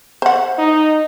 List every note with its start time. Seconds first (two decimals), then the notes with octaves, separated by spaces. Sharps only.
0.22 C5 F#5
0.58 D#4